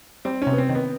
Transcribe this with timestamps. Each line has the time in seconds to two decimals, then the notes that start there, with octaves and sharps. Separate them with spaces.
0.25 G3 C4
0.42 C3 C#4
0.53 B3
0.58 C4
0.69 D#3
0.75 B3